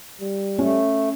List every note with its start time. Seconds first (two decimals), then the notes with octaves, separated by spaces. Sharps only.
0.21 G3
0.59 A3 C#4